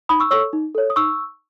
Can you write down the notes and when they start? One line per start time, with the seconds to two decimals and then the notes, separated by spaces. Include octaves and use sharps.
0.09 D#4 B5 D#6
0.20 C#6 E6
0.31 A4 C#5 C#6 E6
0.53 D#4
0.75 A4 C#5
0.90 D#6
0.96 D#4 C#6 E6